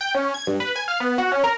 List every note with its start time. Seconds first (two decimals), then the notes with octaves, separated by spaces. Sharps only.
0.01 G5
0.15 C#4
0.34 G#6
0.47 G2
0.60 B4
0.76 G#5
0.88 F5
1.00 B3
1.18 F#4
1.32 C#4
1.44 A#4